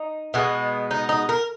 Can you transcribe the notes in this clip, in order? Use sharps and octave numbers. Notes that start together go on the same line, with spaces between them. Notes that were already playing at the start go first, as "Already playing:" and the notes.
Already playing: D#4
B2 G#3 B3
D#4
D#4
A#4